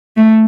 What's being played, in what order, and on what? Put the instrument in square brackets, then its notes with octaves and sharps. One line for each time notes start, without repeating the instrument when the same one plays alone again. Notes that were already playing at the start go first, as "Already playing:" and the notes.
[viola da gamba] A3